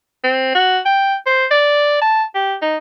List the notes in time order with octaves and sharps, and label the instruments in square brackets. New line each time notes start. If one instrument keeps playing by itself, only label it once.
[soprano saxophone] C4
F#4
G5
C5
D5
A5
G4
D#4